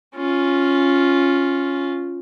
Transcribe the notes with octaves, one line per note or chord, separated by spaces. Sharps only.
C#4 F4